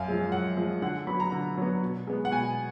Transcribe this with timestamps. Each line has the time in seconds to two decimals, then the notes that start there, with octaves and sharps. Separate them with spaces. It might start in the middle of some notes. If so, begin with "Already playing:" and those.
Already playing: F#2 F5
0.08 F3 G#3
0.32 F#2 F#5
0.57 F3 G#3
0.82 D3 F#5
1.07 F#3 B3 B5
1.20 A#5
1.32 D3
1.58 F#3 B3
1.81 B2
2.07 G#3 B3
2.25 F#5
2.32 B2 G#5